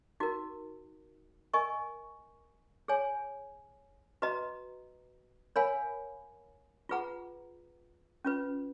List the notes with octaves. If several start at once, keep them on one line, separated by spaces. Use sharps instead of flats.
D#4 F#4 A#4
A#4 D#5 G#5 C#6
G#4 C#5 G#5
F#4 B4 D#5 A#5
A#4 C#5 F5 G#5 B5
F4 G#4 B4 F#5 A#5
C#4 F4 B4